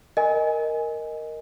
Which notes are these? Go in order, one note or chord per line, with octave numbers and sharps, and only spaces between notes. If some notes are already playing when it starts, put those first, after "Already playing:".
A#4 D#5 G#5